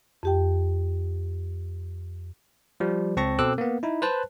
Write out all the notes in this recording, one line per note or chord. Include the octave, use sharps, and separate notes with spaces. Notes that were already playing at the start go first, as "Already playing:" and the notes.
F2 G4 G5
F3 G3
C#2 C4 A5 C#6 A#6
B2 C4 A4 D6 E6 F#6
A#3 B3
D#4 E4
B4 C5 A5 F#6